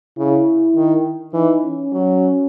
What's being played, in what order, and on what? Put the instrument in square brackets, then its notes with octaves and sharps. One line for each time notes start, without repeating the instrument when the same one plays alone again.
[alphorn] C#3 [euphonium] E4
[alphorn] D#3
[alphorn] E3 [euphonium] D#4
[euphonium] C#4
[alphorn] F#3